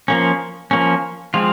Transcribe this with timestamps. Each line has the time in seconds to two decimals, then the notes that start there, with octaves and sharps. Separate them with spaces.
0.08 F3 A#3 C#4
0.71 F3 A#3 C#4
1.34 F3 G#3 C4 F4